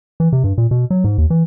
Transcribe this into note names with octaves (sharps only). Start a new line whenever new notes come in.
E3
C3
G2
A#2
B2
F#3
G#2
D#2
E3